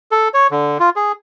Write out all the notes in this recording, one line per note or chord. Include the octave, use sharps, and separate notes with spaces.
A4
C#5
D3
F4
G#4